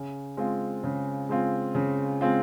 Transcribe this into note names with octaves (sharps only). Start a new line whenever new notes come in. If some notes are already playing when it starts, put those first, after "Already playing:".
Already playing: C#3
G#3 C4 F4
C#3
G#3 C4 F4
C#3
G#3 C4 F4